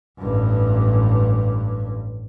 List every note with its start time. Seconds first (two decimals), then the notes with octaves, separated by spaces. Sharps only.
0.18 A1 G2